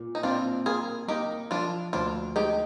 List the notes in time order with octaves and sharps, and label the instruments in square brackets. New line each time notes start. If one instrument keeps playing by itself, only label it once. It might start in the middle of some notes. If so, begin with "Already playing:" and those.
Already playing: [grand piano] A#2
[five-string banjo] D#4
[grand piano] C4 [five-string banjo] D4 F4
[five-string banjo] F4 G#4 [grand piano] A#4
[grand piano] A#3 [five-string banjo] D#4 G4
[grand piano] F3 [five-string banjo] D4 F4
[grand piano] D2 [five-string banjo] D4 F4
[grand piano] G#3 [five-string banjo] D#4 G4